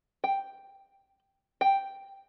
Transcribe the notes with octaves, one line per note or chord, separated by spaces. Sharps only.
G5
G5